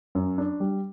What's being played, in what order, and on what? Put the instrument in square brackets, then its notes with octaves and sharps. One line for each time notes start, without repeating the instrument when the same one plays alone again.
[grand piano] F#2
D4
G3